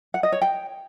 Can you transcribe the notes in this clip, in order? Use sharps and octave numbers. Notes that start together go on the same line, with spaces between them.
F#5
D#5
C#5
G5